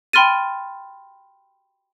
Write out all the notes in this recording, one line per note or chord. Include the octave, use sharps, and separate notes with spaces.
G5 B5 C6 F6 A6 D#7